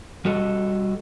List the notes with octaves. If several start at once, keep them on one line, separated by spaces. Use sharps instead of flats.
G3 F#4 A4 D#5